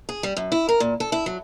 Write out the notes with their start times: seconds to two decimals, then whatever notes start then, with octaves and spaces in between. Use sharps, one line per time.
0.09 G#4
0.23 G3
0.37 F#2
0.52 E4
0.69 A#4
0.80 A#2
1.00 A4
1.12 E4
1.26 F#3